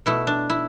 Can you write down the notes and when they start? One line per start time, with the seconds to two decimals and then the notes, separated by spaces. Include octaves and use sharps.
0.06 B2 A3 E4
0.27 D4
0.50 E4